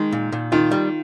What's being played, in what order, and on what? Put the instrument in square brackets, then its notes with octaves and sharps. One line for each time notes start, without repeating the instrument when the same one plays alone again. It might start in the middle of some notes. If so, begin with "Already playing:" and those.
Already playing: [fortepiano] D#3 [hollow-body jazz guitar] G#3
[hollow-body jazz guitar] A#2
A#2
[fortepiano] D#3 [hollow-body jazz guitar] F4
[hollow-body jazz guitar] G3